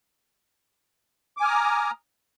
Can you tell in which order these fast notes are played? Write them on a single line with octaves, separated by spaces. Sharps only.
D6 G#5 F6 D#6 A#5